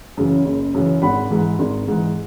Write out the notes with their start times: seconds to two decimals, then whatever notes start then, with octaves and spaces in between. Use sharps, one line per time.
0.17 F#2 C#3 E3
0.46 F#1
0.74 F#2 C#3 E3
1.02 G#1 F#5 B5
1.30 G#2 E3
1.59 G#1
1.88 G#2 E3